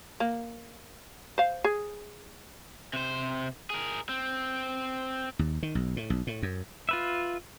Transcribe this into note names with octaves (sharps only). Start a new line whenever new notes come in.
A#3
C5 F5
G#4
C3 C5
G#4 A#4
C4
D#2
D#3
B1
A2
B1
A2
F#2
F4 B4 E5